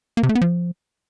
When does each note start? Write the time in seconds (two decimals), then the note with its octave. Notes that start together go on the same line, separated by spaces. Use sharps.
0.17 A#3
0.23 C3
0.29 A3
0.35 B3
0.41 F3